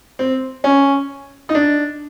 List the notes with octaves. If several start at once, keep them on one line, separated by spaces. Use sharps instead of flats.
C4
C#4
D#4
D4